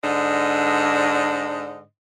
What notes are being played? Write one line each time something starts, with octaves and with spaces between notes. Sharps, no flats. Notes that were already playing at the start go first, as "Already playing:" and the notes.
G#2 D3 D4 D#5